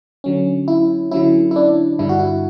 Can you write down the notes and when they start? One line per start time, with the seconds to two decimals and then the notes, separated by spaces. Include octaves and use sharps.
0.24 D3 F#3 C#4
0.68 E4
1.11 D3 F#3 C#4 E4
1.51 E4
1.56 D4
1.99 G2 D3 G3 D4 E4
2.09 F#4
2.19 E4